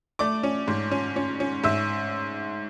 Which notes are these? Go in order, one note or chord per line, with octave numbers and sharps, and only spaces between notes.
A3 D5 D6
C#4
G#2
C#4
C#4
C#4
G#2 E5 E6